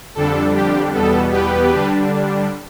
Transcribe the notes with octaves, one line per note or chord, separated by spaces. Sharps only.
F2 D3 G3 D4 A4
G4
E2 B2 G3 B3 A4
G4 B4
D3 G3 D4